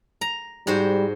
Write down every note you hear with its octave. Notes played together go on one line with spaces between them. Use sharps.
A#5
G#2 G3 F#4 C5